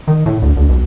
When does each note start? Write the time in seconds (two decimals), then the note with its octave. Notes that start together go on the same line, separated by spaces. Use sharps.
0.08 D#3
0.26 A2
0.42 D2
0.57 D2
0.69 B1